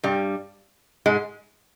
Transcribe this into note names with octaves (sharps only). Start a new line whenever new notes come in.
G2 G3
G#2 G#3